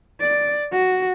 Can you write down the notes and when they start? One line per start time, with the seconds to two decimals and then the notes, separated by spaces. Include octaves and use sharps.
0.20 D5
0.72 F#4